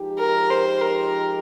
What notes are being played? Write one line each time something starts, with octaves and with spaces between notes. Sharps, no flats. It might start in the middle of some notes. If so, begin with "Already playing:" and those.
Already playing: F3 G#3 D#4 G4
A#4
C5
A#4